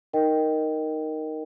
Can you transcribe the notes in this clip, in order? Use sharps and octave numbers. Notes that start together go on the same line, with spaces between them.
D#4 A#4 D#5 G5